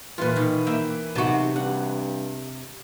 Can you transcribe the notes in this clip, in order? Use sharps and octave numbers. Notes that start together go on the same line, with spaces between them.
A#2 E3 F4 B4
B2 D#3 F5
A#3 E5 G5
B1 C3 F#4 A5
G2 F#5